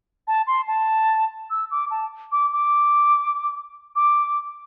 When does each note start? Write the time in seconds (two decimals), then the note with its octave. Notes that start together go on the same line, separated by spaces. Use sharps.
0.27 A5
0.47 C6
0.67 A5
1.50 E6
1.71 D6
1.90 A5
2.32 D6
2.52 D6
3.96 D6